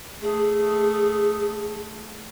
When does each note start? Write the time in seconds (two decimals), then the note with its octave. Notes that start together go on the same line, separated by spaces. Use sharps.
0.21 A3 G#4